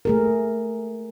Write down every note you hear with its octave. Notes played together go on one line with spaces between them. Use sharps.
A3 G#4 A#4